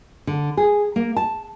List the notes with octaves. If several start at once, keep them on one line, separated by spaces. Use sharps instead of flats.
D3
G#4
A#3
A5